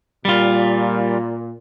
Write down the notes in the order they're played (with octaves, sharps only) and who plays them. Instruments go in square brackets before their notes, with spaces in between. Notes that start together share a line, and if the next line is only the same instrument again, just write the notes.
[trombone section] A#2 [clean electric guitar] G3 F4